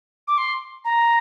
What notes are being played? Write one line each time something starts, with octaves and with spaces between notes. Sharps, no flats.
D6
C6
A#5